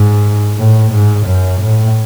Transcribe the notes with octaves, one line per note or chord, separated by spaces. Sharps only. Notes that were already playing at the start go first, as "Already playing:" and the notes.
Already playing: G#2
A2
G#2
F#2
A2